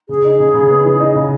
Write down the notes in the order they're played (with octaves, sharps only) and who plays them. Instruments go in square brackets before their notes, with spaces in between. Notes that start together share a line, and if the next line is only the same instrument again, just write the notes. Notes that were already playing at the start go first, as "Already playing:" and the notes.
[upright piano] C#3 [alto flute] G#4
[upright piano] D#4
C#3
C#3
B3
E3
D#4
C#3